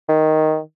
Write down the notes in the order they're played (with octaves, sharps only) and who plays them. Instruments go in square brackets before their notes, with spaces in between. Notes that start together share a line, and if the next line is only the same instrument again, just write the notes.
[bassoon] D#3